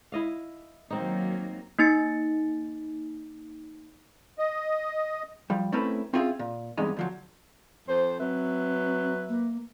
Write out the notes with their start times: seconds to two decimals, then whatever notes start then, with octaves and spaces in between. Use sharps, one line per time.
0.12 E4 D#5 F5
0.90 D#3 F#3 A#3 C4 D#4
1.79 A#3 D#4 A6 C#7
4.38 D#5
5.50 F3 G3
5.72 A3 C4 C#4 E4 A#4 B4
6.14 C4 C#4 F4 G#4 E5
6.39 A#2
6.78 E2 G2 C3 G#3 D#4
6.97 D2 F3 F#3
7.88 F2 C5
8.19 F#3 C4 B4 E5
9.29 A#3